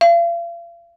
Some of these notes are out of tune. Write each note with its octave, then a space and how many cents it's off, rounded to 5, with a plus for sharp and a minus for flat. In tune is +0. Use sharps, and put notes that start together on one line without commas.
F5 -40